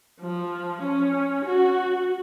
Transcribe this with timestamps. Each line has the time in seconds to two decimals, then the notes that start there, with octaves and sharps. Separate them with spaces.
0.20 F3
0.82 C#4
1.45 F#4